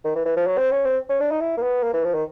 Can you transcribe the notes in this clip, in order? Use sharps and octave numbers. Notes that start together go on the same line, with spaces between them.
D#3
E3
E3
F3
F#3
C4
C#4
C4
C#4
D4
D#4
E4
A#3
B3
A#3
E3
F3
D#3